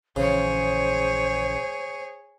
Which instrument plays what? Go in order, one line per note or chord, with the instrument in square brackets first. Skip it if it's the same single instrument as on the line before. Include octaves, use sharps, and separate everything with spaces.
[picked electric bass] A#1 E3 [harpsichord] C#3 [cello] G#4 C#5 [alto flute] C5